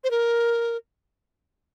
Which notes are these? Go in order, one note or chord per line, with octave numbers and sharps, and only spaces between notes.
C5
A#4